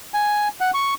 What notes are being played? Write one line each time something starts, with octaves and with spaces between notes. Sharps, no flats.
G#5
F#5
C#6